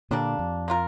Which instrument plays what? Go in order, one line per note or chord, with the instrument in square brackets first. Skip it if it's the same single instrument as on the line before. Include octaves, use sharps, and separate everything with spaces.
[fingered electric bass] A#2 D3 [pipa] G3 A#3 D4
[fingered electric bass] F2
[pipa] A#3 F4 A#4